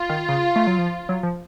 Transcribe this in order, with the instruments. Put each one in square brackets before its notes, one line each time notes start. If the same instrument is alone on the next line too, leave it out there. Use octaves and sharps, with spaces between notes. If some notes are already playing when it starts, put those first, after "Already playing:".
Already playing: [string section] F4
[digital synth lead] D#3
C#3
A3
F#3
F3
F#3
F3